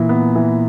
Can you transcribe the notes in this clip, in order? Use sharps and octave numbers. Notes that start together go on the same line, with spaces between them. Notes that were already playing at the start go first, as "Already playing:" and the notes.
Already playing: A#2 E3
B3
E3